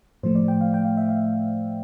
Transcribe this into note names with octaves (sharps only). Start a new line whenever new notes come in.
A2 F3 A3 C5
D5
G5
F5
G5
F5
E5
F5